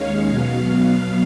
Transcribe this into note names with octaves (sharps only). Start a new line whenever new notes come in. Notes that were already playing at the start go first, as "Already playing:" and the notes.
Already playing: D#2 D#3 G#3 C#4 C#5 F5
B2 F#3 B3 F5